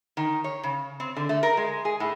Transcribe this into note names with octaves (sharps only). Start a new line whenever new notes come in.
D#3
C#5
C#3
C4
D3
A3
A#4
G#3
G#4
A2